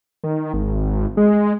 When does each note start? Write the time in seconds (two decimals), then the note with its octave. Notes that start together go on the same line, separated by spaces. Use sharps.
0.24 D#3
0.54 G#1
1.17 G#3